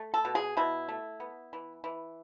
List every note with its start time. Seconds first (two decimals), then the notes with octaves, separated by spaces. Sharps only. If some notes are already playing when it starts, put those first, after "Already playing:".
Already playing: A3
0.14 A4
0.25 B2
0.35 G#4
0.57 B2 E4
0.89 A3
1.20 B3
1.53 E3
1.84 E3